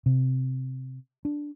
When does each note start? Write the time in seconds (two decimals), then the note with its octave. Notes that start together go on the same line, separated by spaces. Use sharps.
0.06 C3
1.25 D4